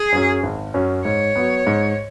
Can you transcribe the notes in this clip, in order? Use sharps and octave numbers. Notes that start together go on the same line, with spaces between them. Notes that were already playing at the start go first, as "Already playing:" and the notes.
Already playing: G#4
F#2 F#3 C#4
G#1
F#2 F#3 C#4
G#2 C#5
F#3 B3
G#2